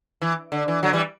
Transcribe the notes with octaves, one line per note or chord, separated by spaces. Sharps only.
E3
D3
E3
D3 F#3
E3 G3